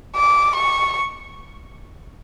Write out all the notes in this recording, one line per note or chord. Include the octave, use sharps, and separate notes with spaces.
D6
C#6